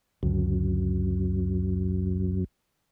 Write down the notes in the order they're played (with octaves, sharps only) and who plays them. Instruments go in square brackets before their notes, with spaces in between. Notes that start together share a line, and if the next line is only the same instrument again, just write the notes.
[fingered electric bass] C#2 D3 [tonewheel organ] F#2